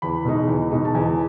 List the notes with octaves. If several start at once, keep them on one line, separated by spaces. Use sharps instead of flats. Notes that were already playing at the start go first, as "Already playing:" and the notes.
E2 B5
B2 G#3 D#4
E2
B2 G#3 D#4
A5
E2 G#5